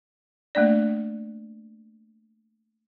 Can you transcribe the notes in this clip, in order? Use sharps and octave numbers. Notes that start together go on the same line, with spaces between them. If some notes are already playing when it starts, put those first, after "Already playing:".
A3 A#3 D4 D5